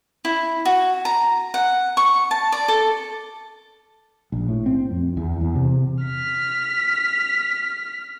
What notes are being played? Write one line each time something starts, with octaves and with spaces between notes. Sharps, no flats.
E4
F#4
A#5
F#5
C#6
A5
D5
A4
A#1
A2
C4
F2
E2
E2
C3
F6 B6